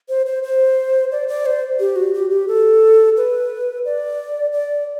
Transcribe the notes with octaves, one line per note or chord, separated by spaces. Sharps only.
C5
C5
C5
D5
D5
C5
G4
F#4
G4
G4
A4
B4
D5
D5